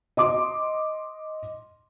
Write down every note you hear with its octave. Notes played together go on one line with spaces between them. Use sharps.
D#5 C6 D6